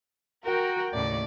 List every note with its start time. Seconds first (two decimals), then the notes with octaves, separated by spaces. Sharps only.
0.45 F#4 A#4 G5 A#5
0.93 D#2 A2 C#3 D5